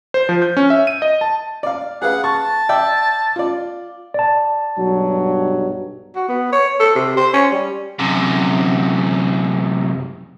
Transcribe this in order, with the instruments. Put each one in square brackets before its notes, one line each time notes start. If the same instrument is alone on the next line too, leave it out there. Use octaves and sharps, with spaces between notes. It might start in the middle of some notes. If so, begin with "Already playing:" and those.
[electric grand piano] C5
F3
G6
C#4
E5
D#7
D#5
A5
[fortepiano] D5 F5
[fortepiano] G#4 B4 F5 [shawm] F#5
[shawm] A5 [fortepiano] C#6
[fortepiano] D5 E5 G5
F4 D5
[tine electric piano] D5 A5
[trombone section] B1 G2 F#3
[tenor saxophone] F#4
B3
C#5
A4
C3
C5
C#4
G3
[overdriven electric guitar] F#2 C3